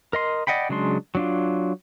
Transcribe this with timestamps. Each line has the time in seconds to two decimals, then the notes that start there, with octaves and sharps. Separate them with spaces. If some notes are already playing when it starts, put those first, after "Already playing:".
0.13 A#4 D#5 C6
0.47 D5 D#5 F#5 G5 B5
0.69 C#3 F#3 G#3 D4 C6
1.15 F#3 D4 F4